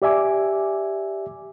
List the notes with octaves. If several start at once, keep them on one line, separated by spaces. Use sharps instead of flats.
G4 D5 E5 G#5 D6